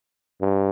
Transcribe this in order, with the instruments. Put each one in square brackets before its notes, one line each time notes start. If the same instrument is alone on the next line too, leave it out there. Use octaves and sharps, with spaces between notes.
[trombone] G2